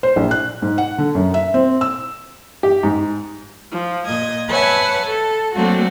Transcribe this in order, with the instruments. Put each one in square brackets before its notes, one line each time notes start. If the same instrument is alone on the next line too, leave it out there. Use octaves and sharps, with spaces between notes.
[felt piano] C5
A#1
F#6
G#2
F#5
D3
F#2
E5
C4
E6
[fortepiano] G4
G#2
[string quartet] F3
A#2 D#5 G#6
B4 C#5 E5 F#5 G#5 A5
A4
F#3 A3 A#3 C4 D4 F#4